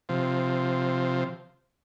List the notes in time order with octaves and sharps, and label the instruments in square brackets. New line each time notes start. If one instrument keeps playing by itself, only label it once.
[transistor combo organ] C3 F3